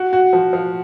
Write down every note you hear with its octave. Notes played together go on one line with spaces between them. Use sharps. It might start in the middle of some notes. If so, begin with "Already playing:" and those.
Already playing: F#4
F#4
F3
F3